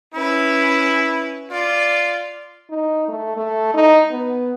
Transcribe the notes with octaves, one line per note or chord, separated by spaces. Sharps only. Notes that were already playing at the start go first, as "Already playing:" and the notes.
C#4 E4 B4
F4 D5
D#4
A3
A3
D#4
B3